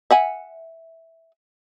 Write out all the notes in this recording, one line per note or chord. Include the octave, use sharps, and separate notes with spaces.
E5 F#5 G#5